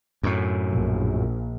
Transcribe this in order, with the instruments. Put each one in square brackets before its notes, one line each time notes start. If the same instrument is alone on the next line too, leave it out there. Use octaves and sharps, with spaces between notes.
[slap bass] F#2 A2
[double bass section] A#1